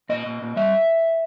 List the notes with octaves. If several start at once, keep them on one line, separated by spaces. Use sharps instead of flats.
A#2 D#5
A#2
A#2
G3 E5